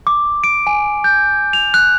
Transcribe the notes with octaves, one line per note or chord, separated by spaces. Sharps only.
D6
D7
G#5
G6
F7
F#6